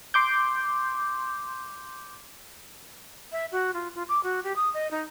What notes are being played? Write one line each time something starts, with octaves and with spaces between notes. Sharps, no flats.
C6 D6 G6
E5
F#4
F4
F4
D6
F#4
G4
D#6
D#5
D#4